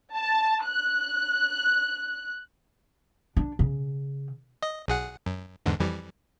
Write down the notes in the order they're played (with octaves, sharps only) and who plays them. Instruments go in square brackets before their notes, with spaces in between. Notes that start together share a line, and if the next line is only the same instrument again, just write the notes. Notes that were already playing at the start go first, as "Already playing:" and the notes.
[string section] A5
F#6
[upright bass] D4
C#3
[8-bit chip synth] D#5
B1 G#4 F#5
F#2
E2 G#2 D3
F2 E3 G3